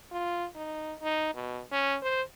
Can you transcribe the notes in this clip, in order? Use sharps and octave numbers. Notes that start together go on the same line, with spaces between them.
F4
D#4
D#4
B2
C#4
C5